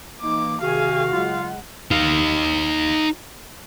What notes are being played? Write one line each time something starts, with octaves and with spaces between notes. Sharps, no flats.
E3 A#3 D#4 D6
C3 D#3 F#4 G#4 F5 G#5
C#3 F#3 G#3 F4 F#5
D#4 F5